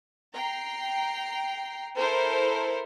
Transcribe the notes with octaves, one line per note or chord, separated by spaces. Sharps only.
G5 A#5 C7
E4 A4 A#4 C5